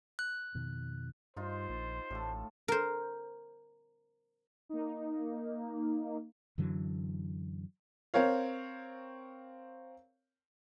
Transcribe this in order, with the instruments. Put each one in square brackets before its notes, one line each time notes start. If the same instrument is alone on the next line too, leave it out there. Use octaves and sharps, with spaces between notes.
[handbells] F#6
[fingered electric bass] F2 B2 D#3
[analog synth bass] G2 [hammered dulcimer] D#4 F4 [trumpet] C5
[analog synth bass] A#1
[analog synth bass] A1 [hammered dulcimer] A2 A4
[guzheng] A#4 C5
[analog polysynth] A#3 D#4
[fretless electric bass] F#2 D3 E3 F#3
[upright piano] C4 A#4 C#5 F5